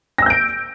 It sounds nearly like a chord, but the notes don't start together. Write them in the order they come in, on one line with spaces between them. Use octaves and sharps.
A#6 E6 G6 D7